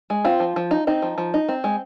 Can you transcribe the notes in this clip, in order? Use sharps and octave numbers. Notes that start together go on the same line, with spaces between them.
G#3
C4 F4
F3
F3
D#4
C4 D#4
F3
F3
D#4
C4
G#3